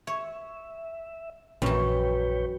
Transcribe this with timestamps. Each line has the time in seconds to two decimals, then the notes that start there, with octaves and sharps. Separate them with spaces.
0.07 C#5 E5
1.62 A#1 F#2 E3 B4 C#5 G5